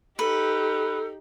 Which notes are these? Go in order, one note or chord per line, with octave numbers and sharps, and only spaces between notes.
D#4 G4 A4 B4